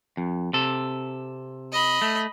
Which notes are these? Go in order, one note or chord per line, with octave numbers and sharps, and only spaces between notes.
F2
C3 A4
D#5 B5
A3